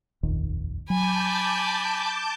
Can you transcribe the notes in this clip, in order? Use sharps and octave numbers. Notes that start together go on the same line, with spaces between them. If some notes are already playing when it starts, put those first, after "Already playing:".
F1 A#1 D#2
F#3 G#5 A5 B5 D6 G6